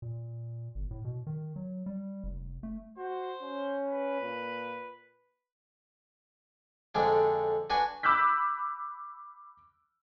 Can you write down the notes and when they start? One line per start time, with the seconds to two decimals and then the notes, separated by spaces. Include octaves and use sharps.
0.02 A#2
0.75 G1
0.91 A2
1.05 B2
1.27 D#3
1.56 F#3
1.86 G3
2.23 F1
2.63 A3
2.98 F#4 C5
3.42 C#4
3.87 B4
4.21 A#2
6.95 F2 D3 G#3 D4
7.70 D4 F#4 B4 G#5
8.03 B5 D6 E6 F#6 G6 B6